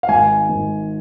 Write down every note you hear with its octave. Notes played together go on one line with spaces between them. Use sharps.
F5
G#1 G#5
G#1